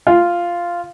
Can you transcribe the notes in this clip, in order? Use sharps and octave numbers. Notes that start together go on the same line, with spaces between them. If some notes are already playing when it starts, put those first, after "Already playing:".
F4